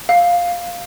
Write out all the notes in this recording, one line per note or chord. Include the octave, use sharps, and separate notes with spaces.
F5